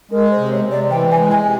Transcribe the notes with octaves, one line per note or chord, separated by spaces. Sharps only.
G#3 A#4
C5
C3
C#5
C3
D5
E3 G5
G#5
G#3
G#5
C3